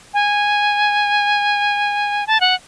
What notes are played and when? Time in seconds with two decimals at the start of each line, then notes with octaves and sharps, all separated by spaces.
0.14 G#5
2.27 A5
2.41 F#5